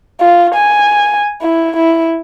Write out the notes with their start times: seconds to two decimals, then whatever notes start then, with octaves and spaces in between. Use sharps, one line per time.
0.20 F4
0.55 G#5
1.42 E4
1.77 E4